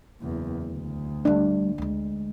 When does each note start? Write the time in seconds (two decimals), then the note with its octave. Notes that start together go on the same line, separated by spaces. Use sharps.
0.21 F#1 E2
0.64 D2
1.25 G3 A3 D4
1.78 D2 G#3